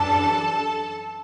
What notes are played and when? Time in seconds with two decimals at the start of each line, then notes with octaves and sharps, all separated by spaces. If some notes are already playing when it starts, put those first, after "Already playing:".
Already playing: F#2 E3 G3 D4 A4 A5